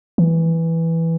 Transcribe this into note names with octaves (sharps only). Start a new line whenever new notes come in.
E3